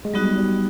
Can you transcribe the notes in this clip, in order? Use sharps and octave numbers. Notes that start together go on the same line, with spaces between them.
G#3
F#3 G3 B3 D#4 F#4
G3